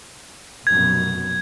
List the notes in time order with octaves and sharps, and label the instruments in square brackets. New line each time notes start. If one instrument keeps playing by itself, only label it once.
[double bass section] F1 F#2 B2 [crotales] G#6